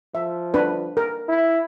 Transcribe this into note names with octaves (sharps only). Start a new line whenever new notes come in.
F3 E5
D4 B4
A#4
E4